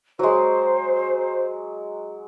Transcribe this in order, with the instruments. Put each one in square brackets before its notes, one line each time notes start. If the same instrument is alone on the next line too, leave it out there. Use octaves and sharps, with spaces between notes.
[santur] F#3 G#3 [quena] C5